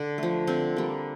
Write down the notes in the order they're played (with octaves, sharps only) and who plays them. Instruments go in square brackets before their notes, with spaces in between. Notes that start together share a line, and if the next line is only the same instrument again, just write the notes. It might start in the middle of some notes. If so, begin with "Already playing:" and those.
Already playing: [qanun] D3
F3 A3
D3 C4
G3 A#3